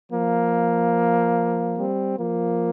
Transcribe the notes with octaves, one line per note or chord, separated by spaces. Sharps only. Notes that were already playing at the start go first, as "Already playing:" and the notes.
F3 A#3
G3 C4
F3 A#3